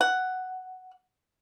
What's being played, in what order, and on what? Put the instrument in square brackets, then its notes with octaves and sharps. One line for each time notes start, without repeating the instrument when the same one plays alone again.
[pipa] F#5